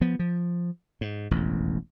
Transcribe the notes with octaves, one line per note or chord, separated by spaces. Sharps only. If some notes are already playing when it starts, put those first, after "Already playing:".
F3 B3
F3
G#2
E1 A1 F2